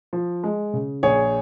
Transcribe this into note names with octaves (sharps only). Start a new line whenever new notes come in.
F3
G#3
C#3
A#1 G#4 C#5